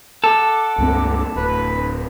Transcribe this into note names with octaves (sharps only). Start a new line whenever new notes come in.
A4 F#5 D6
C#2 G2 C4
D1 B4